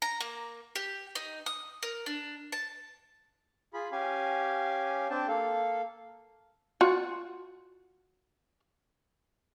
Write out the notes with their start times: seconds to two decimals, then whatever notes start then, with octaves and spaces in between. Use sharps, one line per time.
0.02 A#5
0.20 A#3
0.76 G4
1.15 D#4
1.46 D#6
1.83 A#4
2.06 D4
2.52 A5
3.74 F4 G#4 B5
3.92 C#4 G4 F5 G#5
5.10 C4 D4 G5 A5
5.28 A#3 A4 F5
6.81 F4 F#4